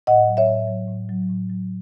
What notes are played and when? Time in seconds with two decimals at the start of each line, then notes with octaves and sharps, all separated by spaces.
0.07 A2 D#5 F#5
0.27 F#3
0.37 C#5 E5
0.48 A2
0.68 F#3
0.88 A2
1.09 F#3
1.29 A2
1.50 F#3